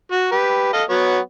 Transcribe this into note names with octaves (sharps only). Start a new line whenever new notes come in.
F#4
G4 B4
A4 D#5 F5
F#3 B3 C#5